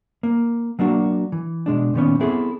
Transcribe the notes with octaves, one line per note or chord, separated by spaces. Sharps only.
A#3
F#3 A#3 D4 F#4
E3
B2 G#3 D4
A#2 D#3 B3 C#4
B3 C4 E4 G#4 A4